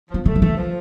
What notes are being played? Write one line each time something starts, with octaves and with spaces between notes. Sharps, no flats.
F3 B3
D3 A3
F3
E3 A3
F3